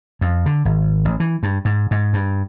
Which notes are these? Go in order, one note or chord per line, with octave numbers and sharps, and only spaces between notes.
F2
D3
G#1
A1
E3
G2
G#2
G#2
G2